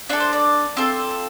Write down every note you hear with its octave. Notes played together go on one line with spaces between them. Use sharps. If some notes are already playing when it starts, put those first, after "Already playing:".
D4 F4 A4 D5
C5
D5
C4 F4 A4